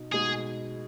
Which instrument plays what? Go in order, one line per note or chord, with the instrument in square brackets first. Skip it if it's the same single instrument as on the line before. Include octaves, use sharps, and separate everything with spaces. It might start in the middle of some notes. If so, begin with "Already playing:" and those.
Already playing: [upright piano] B2 D#4
[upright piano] B2 G#3 D#4 [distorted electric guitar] G#4